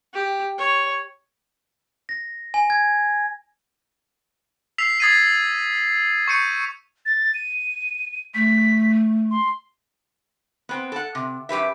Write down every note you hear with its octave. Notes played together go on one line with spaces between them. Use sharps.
G4
C#5
A#6
G#5
G#6
E6 B6 C7 F7
D#6 G#6 A6 B6 C7 D#7
C#6 G6 C#7 D#7
A6
D#7
A3 B6
C6
B3 C4
A4 F#5
C3
F#2 G4 B4 E5